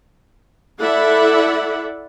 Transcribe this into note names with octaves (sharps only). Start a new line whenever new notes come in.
E4 A4 D5 E5 F#5 B5